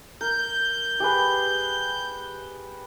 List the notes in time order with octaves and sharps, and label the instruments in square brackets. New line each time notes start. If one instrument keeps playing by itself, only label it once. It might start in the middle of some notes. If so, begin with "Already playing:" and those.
[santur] A#4 [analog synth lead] G6
[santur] G4 G#4 B4